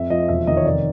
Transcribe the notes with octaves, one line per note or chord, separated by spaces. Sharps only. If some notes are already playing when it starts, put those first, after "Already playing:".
Already playing: F2 E5
F3 D#5
E1 E5
D#3 D#5
C#5
F1 D5